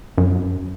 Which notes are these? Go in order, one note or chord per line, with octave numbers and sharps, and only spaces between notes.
F#2